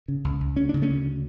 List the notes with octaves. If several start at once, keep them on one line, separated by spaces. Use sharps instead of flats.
C#3
C#2
C#2
D2 C#4
C#3 D4
A3 C#4
D2